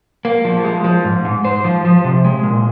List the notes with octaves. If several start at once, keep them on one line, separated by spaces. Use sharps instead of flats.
A#3
F3
G#3
F3
G#2
G#2
C5
F3
F3
C3
G#3
A#2